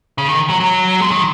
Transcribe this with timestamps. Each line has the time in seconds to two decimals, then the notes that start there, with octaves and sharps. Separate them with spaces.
0.18 C#3
0.29 D#3
0.50 F#3
0.60 F#3
1.01 G#3
1.11 D#3